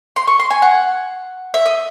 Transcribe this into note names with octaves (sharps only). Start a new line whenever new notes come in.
C6
C#6
C6
G#5
F#5
E5
D#5